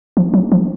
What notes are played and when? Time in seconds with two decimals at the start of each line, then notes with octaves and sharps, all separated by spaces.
0.17 F3
0.34 F#3
0.52 F3